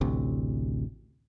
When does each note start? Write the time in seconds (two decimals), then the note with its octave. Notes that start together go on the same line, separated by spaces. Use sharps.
0.01 A1 D2 C3